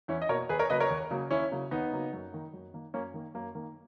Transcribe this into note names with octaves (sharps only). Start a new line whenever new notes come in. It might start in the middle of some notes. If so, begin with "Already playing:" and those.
E2 C#4 E4
D#5
B2 A#3 A#4 C#5
D#2 G#4 B4
A#4 C#5
C#3 F#3 A#3 B4 D#5
A#4 C#5
D#2
C#3 F#3 A#3
D#2 C#4 E4
C#3 F#3 A#3
D#2 B3 D#4
C#3 F#3 A#3
F#2
D#3 A#3
F#2
D#3 A#3
F#2 A#3 C#4
D#3 A#3
F#2 A#3
D#3 A#3